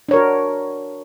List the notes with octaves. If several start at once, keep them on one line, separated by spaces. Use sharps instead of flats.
D4 F#4 A#4 C#5